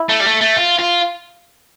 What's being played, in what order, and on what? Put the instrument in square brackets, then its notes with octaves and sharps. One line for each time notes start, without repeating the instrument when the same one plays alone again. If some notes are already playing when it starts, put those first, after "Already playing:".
Already playing: [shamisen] E4
[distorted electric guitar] A3
G3
A3
A3
F4
F4